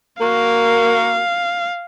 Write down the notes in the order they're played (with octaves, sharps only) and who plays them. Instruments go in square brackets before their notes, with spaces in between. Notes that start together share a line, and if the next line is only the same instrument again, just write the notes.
[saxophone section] A#3 F#4 A#4 [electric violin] F5